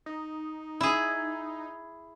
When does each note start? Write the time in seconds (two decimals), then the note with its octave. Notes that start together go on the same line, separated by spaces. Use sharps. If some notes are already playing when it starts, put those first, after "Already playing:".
0.06 D#4
0.81 E4 G#4